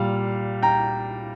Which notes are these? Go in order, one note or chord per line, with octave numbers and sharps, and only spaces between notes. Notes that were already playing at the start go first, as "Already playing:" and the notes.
Already playing: A#2 G3 F5
G5 A#5